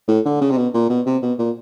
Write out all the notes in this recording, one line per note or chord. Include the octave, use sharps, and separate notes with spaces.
A2
D3
C#3
C3
B2
A#2
B2
C3
B2
A#2